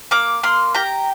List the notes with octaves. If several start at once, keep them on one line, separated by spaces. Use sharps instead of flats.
A#3 D6
A#3 C6
G4 A#5